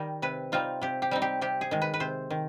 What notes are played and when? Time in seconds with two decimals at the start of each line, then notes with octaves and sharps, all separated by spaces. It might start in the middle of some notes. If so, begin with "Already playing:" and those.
Already playing: D#3 G3 D#5
0.22 C3 B4
0.52 G3 C4 D#4 F4
0.81 C3 G4
1.02 G4
1.11 G3 C4 D#4
1.22 G4
1.41 C3 G4
1.61 G#4
1.71 D#3 G#3
1.82 B4
1.94 B4
2.00 C3 C5
2.30 D#3